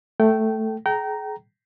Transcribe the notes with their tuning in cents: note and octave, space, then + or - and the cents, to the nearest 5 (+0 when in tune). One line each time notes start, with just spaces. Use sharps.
A3 +0 A4 +0 G5 -20
G#4 +35 G5 -30 A#5 +0